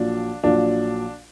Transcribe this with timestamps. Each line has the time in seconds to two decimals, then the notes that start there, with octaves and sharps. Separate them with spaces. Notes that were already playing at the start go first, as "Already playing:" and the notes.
Already playing: A#1 A#2 F#3 D4
0.43 A#1 A#2 F#3 D4